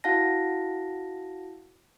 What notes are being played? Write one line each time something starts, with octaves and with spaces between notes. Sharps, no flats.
E4 F#4 F5 F#5 A5 A#6